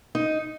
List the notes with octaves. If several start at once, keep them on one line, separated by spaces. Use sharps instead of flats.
D#4